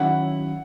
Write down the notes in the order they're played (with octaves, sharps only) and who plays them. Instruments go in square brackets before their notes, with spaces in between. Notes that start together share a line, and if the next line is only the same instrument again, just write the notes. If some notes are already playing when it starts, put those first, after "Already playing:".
Already playing: [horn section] D#3 F#3 C#4 E4 [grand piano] F#5